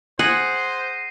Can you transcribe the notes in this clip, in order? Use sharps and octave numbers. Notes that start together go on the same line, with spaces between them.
G#4 C5 F#5 A#6 C7 D#7